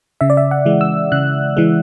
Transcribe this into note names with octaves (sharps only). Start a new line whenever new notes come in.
C#3 E5
D5
E5
F#5
E3 G#3
E6
C#3 F#6
E3 G#3